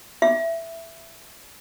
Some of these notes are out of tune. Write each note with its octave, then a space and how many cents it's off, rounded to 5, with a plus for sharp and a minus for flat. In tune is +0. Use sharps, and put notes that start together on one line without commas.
E5 +10